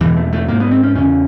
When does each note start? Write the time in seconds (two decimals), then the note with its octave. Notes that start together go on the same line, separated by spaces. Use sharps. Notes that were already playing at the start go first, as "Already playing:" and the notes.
0.01 E2 B2 E3
0.17 A3
0.33 A3
0.48 G#2 A#3
0.60 B3
0.71 C4
0.83 C#4
0.95 E2 C#3 C#4